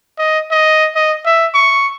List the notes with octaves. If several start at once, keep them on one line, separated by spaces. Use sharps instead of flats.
D#5
D#5
D#5
E5
C#6